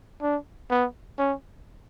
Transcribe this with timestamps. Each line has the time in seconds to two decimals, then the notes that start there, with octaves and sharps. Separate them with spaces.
0.22 D4
0.71 B3
1.19 C#4